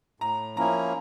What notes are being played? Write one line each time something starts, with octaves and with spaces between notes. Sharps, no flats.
A2 A#5
F3 A#3 C#4 E4 A#5